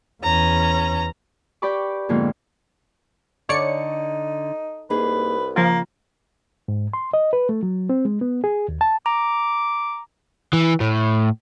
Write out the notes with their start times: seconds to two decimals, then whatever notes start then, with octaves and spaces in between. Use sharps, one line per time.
0.23 E2 C#4 A#5
1.62 G4 B4 D5 B5 C#6 D6
2.09 F2 G#2 D3 A#3 B3 F4
3.49 D3 D#4 C#5 D5 C#7
4.90 C2 A#3 D#4 G#4 B4
5.56 C#3 F3 A#3 F4 G5
6.68 G#2
6.93 C6
7.13 D#5
7.33 B4
7.49 A3
7.63 F#3
7.89 C4
8.05 G#3
8.21 B3
8.44 G#4
8.68 D#2
8.81 A5
9.06 A#5 D6
10.53 E3
10.81 A2